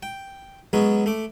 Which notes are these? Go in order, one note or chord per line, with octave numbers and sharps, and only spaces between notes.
G5
F#3 G#3 B3 C#4
A3 D6